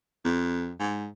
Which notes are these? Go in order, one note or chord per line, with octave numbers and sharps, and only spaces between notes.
F2
G#2